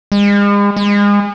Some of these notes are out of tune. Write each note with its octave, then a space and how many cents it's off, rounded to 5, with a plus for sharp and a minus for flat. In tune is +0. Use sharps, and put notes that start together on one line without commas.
G#3 -40
G#3 -30